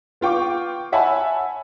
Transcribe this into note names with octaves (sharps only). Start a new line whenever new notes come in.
B3 F4 G5 C#6 D6
C#5 E5 F#5 G#5 A5 B5